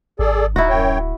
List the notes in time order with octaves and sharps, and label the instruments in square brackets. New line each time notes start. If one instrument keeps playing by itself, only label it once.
[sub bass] G#1 [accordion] G#4 A4 D5
[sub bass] D1 [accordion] D#4 [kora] E4 F#4
[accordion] F#2 C#5 G5